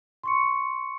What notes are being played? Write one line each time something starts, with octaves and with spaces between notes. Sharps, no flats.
C6 C#6 C#7